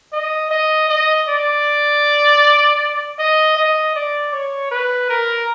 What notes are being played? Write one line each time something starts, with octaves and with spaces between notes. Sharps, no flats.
D#5
D#5
D#5
D5
D#5
D#5
D5
C#5
B4
A#4